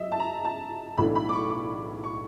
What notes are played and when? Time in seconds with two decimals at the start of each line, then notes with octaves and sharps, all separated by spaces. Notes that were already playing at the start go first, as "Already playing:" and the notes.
Already playing: F#3 D#5 E5
0.12 A5
0.20 A#5
0.45 A5
0.98 B1 A2 E3 A3 D4 B5
1.15 B5
1.29 D6
1.33 C#6
1.50 D6
2.04 C#6